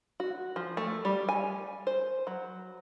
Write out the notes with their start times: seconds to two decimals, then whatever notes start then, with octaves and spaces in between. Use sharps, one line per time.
0.20 F#4
0.56 F3
0.77 A3
1.05 G3
1.29 G#5
1.87 C5
2.27 F#3